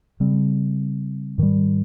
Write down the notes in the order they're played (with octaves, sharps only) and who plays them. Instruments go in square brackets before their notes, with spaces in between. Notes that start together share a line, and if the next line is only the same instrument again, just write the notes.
[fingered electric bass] C#3 G3 C4
G#2 D#3 G3